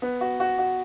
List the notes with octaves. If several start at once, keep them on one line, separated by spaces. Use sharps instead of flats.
B3
F#4
F#4
F#4